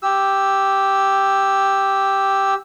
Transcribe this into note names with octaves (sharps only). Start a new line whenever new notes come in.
G4 E6